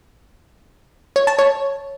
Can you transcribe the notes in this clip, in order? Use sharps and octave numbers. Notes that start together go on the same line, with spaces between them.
C#5
A5
C#5